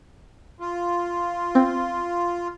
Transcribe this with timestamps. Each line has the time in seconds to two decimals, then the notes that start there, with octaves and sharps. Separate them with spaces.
0.60 F4
1.55 C4